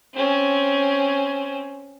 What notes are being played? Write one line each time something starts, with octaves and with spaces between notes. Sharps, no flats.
C4 C#4